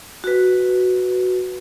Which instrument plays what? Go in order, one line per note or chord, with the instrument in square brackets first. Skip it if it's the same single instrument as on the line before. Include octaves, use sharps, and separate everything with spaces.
[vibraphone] F#4 B4